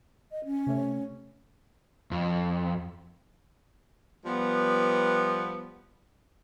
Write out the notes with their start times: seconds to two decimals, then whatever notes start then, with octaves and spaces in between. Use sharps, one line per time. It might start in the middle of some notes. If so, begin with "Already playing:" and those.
0.31 D#5
0.45 C#4
0.66 C3 A3 C#5
2.11 F2
4.26 F3 G3 B3